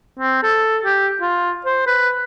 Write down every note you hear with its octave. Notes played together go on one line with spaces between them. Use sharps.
C4
A4
G4
F4
C5
B4